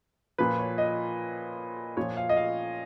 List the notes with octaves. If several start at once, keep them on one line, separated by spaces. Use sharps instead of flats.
A#2 F3 B4
C#5
D#5
A#2 F3 C#5
F5
D#5
F5